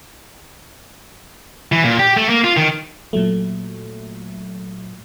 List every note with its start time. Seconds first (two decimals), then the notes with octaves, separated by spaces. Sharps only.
1.72 E3
1.84 A#2
1.99 G4
2.17 A3
2.29 A#3
2.44 F4
2.57 D#3
3.13 A#2 F#3 A3